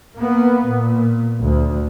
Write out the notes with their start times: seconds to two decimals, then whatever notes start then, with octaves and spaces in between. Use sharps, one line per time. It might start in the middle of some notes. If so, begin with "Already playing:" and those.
0.17 A#3 B3
0.66 A#2
1.41 D2